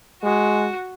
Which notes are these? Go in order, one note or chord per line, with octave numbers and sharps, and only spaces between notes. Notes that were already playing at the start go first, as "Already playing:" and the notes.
G#3 F#4